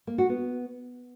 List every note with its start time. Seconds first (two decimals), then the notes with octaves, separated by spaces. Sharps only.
0.07 A#3
0.18 F#4
0.29 B3